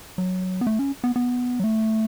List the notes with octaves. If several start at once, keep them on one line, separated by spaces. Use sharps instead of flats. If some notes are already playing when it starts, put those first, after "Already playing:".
F#3
B3
A3
C#4
B3
B3
F#3
A3